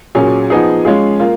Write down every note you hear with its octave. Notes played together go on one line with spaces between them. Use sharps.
A#2 F#3 C#4 G#4
F3 B3 D#4 G#4
G#3 C#4 F4 G#4
A#3 F4